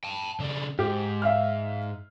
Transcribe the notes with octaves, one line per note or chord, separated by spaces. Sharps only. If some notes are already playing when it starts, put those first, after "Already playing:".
G5 A5
C#3 D4
G#2 G4
E5 F5 F6